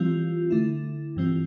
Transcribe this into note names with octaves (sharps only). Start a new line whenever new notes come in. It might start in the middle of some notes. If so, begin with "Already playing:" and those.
Already playing: E3 G3 C4 F4
D3 A3 E4
G2 E3 G3 C4 F4